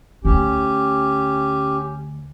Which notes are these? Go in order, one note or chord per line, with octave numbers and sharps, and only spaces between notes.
D2 C#4 G4